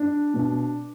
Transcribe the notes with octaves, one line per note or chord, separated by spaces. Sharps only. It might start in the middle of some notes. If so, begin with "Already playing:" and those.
Already playing: D4
B2